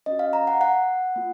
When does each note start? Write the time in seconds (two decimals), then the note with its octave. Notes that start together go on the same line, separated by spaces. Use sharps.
0.06 C#4 F#4 D#5
0.19 F5
0.33 A#5
0.47 F#5
0.61 F#5
1.16 A#3 F4